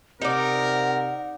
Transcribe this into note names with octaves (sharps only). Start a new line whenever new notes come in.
C3 D#4 A#4 D5 F#5